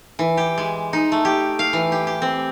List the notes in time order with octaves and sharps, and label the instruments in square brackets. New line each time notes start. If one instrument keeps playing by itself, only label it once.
[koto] E3
G4
G#3
D#4
A3
G4
F5
E3
G4
G4
C4